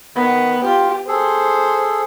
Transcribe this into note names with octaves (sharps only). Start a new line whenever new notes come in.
D#3 B3 B5
F4 G4
G#4 A4 C5